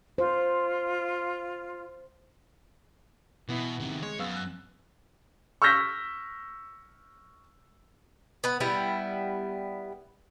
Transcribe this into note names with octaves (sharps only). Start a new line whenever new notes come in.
F4 C5
B2 E3 B3 E4
C3 D#3
G#3 C#5
F#2 B3 F5 E6
F#6
C#6 E6 F6 G6 A#6 B6
B3 B4
G3 B3 E4